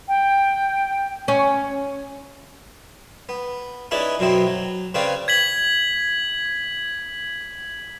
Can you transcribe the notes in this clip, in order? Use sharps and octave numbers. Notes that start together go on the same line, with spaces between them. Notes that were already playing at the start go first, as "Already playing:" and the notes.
G5
C#4
B3
C#4 D#4 E4 G#4 B4 D5
F#2 B2 F#3 C4 E4
F#3
C#3 C4 B4 C#5 D5 F5
G#6 B6 F#7